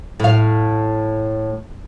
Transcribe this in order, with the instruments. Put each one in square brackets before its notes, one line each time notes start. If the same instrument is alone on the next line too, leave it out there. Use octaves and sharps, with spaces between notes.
[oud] A2 F5